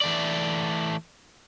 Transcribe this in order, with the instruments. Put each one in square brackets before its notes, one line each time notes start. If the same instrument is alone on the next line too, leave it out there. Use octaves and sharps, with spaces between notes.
[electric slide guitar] E3 A3 D5